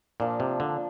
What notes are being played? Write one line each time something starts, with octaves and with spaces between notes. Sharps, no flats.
A#2 F3 A#3 D4
C3
D3